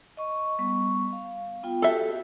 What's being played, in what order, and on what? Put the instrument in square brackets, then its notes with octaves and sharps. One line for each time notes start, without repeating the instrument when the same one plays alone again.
[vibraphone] D#5 C#6
G3 B3 C#6
F5
B3 F4 G5
[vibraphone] F#4 G4 [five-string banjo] A4 E5